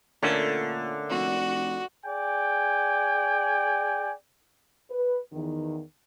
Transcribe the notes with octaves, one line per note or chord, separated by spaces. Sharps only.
A#2 D3 A3 A#3 C#4
F1 F#4
G#4 D5 G5 G#5
B4
E2 D#3